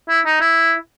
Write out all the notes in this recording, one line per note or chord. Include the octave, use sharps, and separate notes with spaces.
E4
D#4
E4